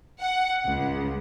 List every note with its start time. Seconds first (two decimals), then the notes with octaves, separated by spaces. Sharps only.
0.20 F#5
0.67 C#2